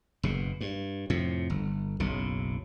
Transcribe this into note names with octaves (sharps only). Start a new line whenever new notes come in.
F#1 B2
G2
F2 A2 C3
G1
F#1 B1 C#3